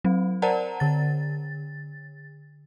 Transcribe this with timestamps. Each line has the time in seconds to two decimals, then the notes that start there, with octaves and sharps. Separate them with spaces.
0.04 F#3 C4
0.42 A#4 C5 D5 F#5 A5 A#5
0.80 D3 A6